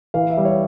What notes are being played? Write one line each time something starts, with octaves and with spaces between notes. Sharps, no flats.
E3 F5
E5
G3
C#5